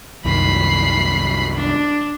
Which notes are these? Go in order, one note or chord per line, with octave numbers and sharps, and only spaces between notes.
C2 F#2 D#3 B5 C7
D4